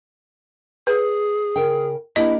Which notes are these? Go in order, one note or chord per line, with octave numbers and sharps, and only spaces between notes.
G#4 B4
C#3 A#4 G5
A#3 D4 E4 G4 D#5